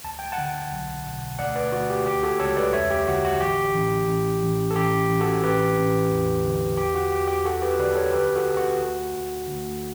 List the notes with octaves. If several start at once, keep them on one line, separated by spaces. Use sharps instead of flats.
D2 A5
G5
F#5 A5
D3
B1
B2
D2 D5 F#5
B4 D5
D2 F#4
G4
C#2 G4
F#4 A4
C#2 A4 C#5
B4 D5
E2 C#5 E5
G4
D3 F#4
F#4
A1 G4
A1
A1
A1
A4
A1 G4
A1
F#4 A4
A1 G4 B4
A1
E2
D3
E2 G4
F#4
E2 G4
G4
D2 F#4 A4
G4 B4
D3 B4 D5
A4 C#5
D2 G4 B4
F#4 A4
D2
F#4
D2
D2
D2